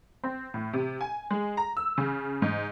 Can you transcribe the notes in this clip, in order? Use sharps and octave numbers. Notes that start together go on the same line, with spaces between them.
C4
A2
C3
G#5
G#3
A#5
E6
C#3
G#2